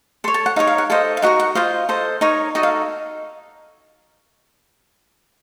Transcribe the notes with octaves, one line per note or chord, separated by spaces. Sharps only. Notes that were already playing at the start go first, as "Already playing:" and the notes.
A4 C#5 C6
A5
F#5
D#4 A#4 C#5 F5
F5
F#5
A4 C5 D#5 F5
F5
D#4 F#4 A#4 F#5
F#5
F4 C5 D#5 F5
A4 C5 D#5
D#4 A#4 C#5
D#4 F#4 A4 D#5
F5